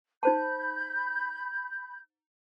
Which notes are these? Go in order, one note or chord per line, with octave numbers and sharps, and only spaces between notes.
D#4 C5 A5 B5 G6